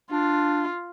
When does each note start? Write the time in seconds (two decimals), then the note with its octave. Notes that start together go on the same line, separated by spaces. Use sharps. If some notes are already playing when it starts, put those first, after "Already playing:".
0.11 D4 F4